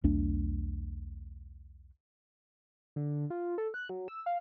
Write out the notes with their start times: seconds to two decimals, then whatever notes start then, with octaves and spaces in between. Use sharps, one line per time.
0.04 B1 E2 A3 D4
2.96 D3
3.30 F4
3.58 A4
3.74 F#6
3.89 F#3
4.08 E6
4.26 F5